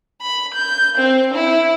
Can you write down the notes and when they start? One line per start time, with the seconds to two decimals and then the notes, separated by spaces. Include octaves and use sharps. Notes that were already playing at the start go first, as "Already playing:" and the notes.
0.22 B5
0.54 G6
0.98 C4
1.34 E4